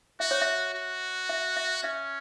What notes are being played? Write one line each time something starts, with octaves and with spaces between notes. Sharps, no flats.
F#4 E5
C#5
E5
F#4
E5
E5
C#4 E5